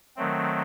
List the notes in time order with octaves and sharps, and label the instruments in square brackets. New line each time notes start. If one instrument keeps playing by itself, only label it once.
[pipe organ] D#3 F#3 A3 C4